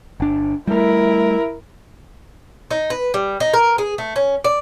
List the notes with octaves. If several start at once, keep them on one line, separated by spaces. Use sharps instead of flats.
G1 D4
G3 A3 E4 A#4
D#4
B4
G3
D#4
A#4
G#4
A3
C#4
D5